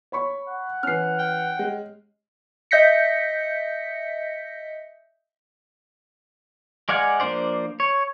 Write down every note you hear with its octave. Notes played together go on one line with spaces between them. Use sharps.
C#5 B5 C#6
F#5
E3 C#4 F6 C7
G5
G#3
D#5 E5 G6 A#6 B6 C#7
G#3 D5 F5 F#5 G#5
F3 A#3 D4 C5 D5
C#5